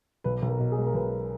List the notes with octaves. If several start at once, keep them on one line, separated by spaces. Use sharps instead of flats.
B1 B4
B1
A#4
B2
G#4
G#3
A#4
B1 B4